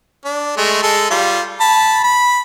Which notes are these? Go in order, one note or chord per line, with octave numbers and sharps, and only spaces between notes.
D4
G#3 A3
G#3 A4
G3 F4
A5 B5
B5